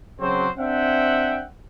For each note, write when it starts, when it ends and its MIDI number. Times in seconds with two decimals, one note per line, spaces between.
0.20 0.48 49
0.20 0.48 54
0.20 0.48 60
0.20 0.48 66
0.20 0.48 72
0.58 1.44 60
0.58 1.44 62
0.58 1.44 76
0.58 1.44 78
0.58 1.44 79